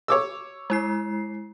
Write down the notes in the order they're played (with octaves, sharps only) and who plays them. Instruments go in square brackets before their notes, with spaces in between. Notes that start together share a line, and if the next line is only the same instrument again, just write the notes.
[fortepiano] C#5 D6 E6
[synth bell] G#3 E4 C7